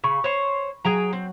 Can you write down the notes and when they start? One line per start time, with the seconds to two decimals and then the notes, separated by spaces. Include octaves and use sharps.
0.04 C#3 B5 C#6
0.24 C5 C#5
0.84 F#3 G#4 G5 A#5
1.13 C4